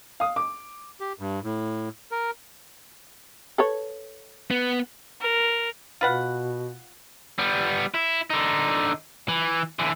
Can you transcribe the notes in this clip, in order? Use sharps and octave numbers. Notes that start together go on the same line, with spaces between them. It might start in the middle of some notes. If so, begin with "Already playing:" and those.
F5 D#6
D6
G4
G2
A2
A#4
A4 B4 C#5
B3
A#4
B2 F4 B4 F#5
G3 B3
E4
D3 D#4
E3
D3 E3